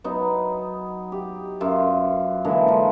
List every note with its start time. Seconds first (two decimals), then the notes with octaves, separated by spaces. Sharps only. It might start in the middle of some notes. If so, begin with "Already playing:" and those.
0.04 F#3 B3 D#4
1.12 G4
1.60 F#2 F4 E5
2.45 D3 E3 G#3 A#3
2.68 F3 F4